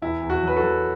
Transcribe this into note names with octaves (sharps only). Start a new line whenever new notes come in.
E2 E4
E2
F#4
F#3 B4
F#4 A4
F#3